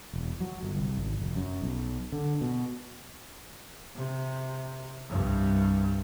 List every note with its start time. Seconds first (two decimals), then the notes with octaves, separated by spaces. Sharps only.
0.13 E1
0.40 F#3
0.63 G1
0.77 C2
0.97 G#1
1.19 F1
1.36 F#2
1.62 B1
2.12 D3
2.41 B2
3.95 C3
5.07 C2 G2